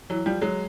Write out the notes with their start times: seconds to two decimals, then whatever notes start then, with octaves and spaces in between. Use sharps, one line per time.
0.10 E3 F#3
0.26 F3 G3
0.41 F#3 G#3